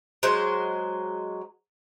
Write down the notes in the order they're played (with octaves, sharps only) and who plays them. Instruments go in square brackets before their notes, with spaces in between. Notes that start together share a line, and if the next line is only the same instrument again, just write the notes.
[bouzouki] F#3 G#3 C5 F#5